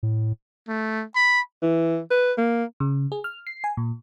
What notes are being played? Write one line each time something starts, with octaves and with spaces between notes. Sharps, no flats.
A2
A3
B5
E3
B4
A#3
C#3
G#4
F6
C7
G#5
A#2